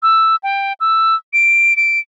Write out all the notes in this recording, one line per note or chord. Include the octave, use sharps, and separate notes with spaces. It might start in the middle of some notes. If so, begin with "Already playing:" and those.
E6
G5
E6
D7
D7